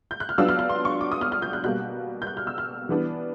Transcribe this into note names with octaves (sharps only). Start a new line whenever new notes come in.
G6
F#6
F6
F#3 B3 D4 F4 E6
F6
F6
C6
C#6
D6
D#6
F6
F6
G6
F#6
B2 G3 A#3 F#6
G6
F#6
F6
E6
F6
E3 G3 B3 D4